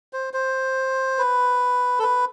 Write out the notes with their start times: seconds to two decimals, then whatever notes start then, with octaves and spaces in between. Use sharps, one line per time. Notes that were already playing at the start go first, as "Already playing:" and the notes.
0.13 C5
0.34 C5
1.18 B4
1.99 A4
2.03 B4